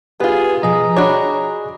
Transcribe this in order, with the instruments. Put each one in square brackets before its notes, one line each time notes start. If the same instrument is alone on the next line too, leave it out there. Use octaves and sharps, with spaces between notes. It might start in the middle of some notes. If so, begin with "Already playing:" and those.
[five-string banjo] B3 F4 [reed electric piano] G4 B4 [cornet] G#4
[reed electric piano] B2 F3 [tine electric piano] G#4 D#5 [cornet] A#5
[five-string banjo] D4 F#4 C#5 [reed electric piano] B5 D6